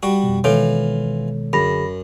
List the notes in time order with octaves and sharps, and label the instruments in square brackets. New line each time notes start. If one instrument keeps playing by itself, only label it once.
[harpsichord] G3 F#4
[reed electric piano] F2 B2
[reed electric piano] B2 D#3 G#3 [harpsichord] E3 F4 [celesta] A4 C#5
[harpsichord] F#2 [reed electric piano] D3 G#4 [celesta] B5 A#6